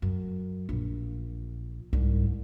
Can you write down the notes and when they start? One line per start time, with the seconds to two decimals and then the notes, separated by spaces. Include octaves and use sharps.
0.02 F#2
0.69 A#1
1.93 C2 G#2